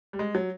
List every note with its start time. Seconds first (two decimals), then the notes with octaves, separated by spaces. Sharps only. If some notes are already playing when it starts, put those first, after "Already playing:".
0.13 G3
0.19 G#3
0.35 F#3